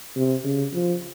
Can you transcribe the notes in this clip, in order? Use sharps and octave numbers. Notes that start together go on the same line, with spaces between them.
C3
C#3
F3